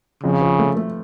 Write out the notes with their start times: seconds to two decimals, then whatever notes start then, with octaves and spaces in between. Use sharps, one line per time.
0.23 F2 C#3
0.41 F3
0.59 A3
0.77 A3